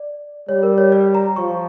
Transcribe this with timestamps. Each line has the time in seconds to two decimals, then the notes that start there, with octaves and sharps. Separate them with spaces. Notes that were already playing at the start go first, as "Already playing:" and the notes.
Already playing: D5
0.49 G3 C#5
0.63 A#4
0.78 C#5
0.92 D5
1.15 A#5
1.36 F3 C#6